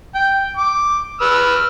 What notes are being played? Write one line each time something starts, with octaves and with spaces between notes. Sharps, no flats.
G5
D6
B4 E6 F6
F6